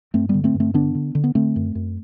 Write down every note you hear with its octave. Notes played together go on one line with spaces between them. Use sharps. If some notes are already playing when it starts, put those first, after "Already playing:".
G2 A3 C4
D3 G3 B3
A3 C4
G2
A3 C4
D3 B3 D4
D3
D3
B3
D3 A3 C4
F#2
F#2